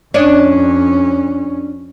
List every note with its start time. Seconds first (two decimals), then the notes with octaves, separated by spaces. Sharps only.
0.14 F2 C#4 D4 C#5 D#5